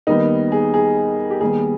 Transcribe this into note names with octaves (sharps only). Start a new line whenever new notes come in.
D#2 D#3 G3 B3 D#4
G#4
G#4
G4
D#2 D#3 G3 B3 G#4